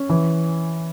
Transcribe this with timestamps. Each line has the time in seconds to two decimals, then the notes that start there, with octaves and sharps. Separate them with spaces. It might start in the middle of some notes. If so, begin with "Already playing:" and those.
Already playing: C#4
0.09 E3